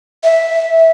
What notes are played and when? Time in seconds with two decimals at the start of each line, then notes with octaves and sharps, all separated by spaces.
0.24 E5